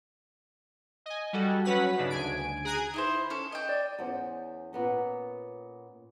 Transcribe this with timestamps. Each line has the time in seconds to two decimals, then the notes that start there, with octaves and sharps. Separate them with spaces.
1.06 D#5 G#5
1.33 G3 F#4 A4
1.65 F#3 C#4 B4 F#5 B6
1.97 G2 C#3 D4 D#4
2.10 D2 G#5 D7
2.65 G#4 A#5 F#6 G#6 D#7
2.94 D#4 E4 C5
3.30 C#4 A4
3.52 D#5 G5
3.69 D5
3.99 E2 C#4 C5
4.73 A#2 B3 C#4